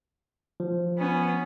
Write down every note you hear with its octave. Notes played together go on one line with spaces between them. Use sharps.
F3
B3 C#4